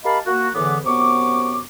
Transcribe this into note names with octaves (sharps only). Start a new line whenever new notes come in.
G4 A#4 D#5 F5 A5 B5
A#3 F#4
E2 A2 D3 E3 B3 D6
F#2 C3 B3 C#6 D6